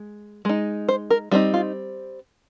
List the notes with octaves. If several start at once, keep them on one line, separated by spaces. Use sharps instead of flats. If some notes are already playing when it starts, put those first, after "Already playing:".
Already playing: G#3
G#3 D#4
C5
A#4
G3 C4 D#4 F4
F4